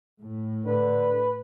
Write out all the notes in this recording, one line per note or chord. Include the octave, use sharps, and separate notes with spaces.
A2
D3 B4